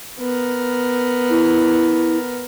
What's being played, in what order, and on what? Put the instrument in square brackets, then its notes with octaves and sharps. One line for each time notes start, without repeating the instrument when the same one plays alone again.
[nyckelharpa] B3 A#4
[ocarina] E4